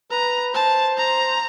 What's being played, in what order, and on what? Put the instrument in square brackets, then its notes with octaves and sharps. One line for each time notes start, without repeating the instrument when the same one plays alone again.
[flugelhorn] B4 [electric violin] A#5
[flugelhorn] C5 [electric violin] A5
[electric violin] A#5